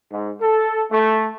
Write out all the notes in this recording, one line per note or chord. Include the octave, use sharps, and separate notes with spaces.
G#2
A4
A3